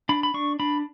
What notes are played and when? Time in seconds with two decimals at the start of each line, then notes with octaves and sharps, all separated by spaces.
0.09 D4 B5
0.23 B5
0.34 D4 C#6
0.60 D4 B5